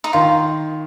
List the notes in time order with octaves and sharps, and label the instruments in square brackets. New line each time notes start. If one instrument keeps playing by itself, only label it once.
[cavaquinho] D#4
[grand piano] D#3 [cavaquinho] F4